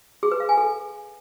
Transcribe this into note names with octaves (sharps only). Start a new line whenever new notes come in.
G#4
B4
F5
G#5
A4